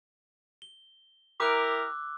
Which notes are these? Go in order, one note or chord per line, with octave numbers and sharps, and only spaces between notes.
G7
E4 G4 A#4 D6 E6 F#6